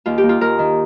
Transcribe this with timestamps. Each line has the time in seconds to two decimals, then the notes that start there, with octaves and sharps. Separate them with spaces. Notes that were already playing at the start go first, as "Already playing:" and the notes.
0.06 D#2 F4
0.18 G4
0.23 A#3
0.29 F4
0.41 D#2 A#4
0.59 D#3